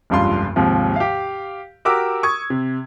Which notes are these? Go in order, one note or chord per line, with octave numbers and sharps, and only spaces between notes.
F1 C#2 G2 F4 C6
D#2 G#2 C3 F3
G4 F5
F#4 G4 A#4 D6 E6
C#6 D#6 G#6
C3